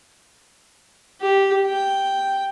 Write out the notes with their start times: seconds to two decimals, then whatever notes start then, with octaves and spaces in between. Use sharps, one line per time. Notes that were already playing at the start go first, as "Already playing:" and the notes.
1.21 G4
1.67 G5